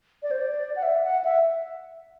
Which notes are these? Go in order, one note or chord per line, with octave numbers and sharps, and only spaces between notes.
D5
C5
D5
F#5
E5
F#5
E5